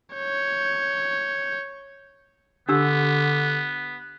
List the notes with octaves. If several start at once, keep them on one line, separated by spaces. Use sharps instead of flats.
C#5 G6
D3 B3 D4 G4 E6